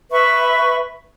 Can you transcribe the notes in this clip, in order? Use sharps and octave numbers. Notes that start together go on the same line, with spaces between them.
B4 E5 B5 C#6